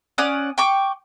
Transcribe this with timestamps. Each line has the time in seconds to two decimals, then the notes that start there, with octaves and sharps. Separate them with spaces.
0.18 C#4 D5 F#5 D#6
0.58 G5 C#6 D6